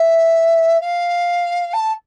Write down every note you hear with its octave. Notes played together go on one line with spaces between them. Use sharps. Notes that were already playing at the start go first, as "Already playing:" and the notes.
Already playing: E5
F5
A5